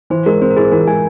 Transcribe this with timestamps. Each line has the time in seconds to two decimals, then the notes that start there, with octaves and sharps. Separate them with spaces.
0.10 E3 C5
0.26 G#3 A#4
0.41 C4 C5
0.51 A#4
0.57 E4 G#4
0.72 E3 A#4
0.87 G#3 G#5